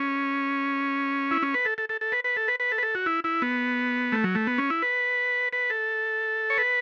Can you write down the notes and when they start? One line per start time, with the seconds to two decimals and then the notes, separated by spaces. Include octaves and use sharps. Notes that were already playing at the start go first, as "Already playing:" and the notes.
Already playing: C#4
1.31 E4
1.42 C#4
1.54 B4
1.65 A4
1.78 A4
1.89 A4
2.01 A4
2.12 B4
2.24 B4
2.37 A4
2.48 B4
2.60 B4
2.72 A4
2.78 B4
2.83 A4
2.95 F#4
3.06 E4
3.24 E4
3.42 B3
4.12 A3
4.24 F#3
4.35 A3
4.47 B3
4.58 C#4
4.70 E4
4.82 B4
5.53 B4
5.70 A4
6.50 C#5
6.58 B4